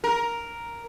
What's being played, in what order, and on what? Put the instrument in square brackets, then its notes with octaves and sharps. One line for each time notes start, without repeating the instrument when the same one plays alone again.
[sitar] A#4